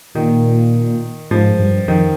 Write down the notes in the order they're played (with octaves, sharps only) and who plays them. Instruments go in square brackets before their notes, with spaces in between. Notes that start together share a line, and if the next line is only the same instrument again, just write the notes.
[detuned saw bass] A#2 [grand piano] D#3
[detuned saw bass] G#2 [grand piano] F3
[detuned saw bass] G2
[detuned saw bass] F2 [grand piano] D#3